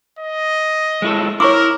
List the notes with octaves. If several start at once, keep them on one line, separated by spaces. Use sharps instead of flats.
D#5
G#3 E4 A4
E4 A#4 C#5 C#6 D6